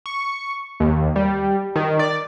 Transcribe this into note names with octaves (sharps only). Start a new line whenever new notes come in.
C#6
D#2
G3
D#3
D5